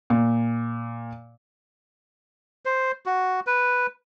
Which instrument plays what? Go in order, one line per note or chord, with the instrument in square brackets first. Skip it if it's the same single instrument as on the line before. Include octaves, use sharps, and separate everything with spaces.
[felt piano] A#2
[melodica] C5
F#4
B4